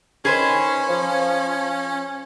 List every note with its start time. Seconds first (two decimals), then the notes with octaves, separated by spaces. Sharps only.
0.25 D#3 C#4 G#4 B4 C5
0.89 F3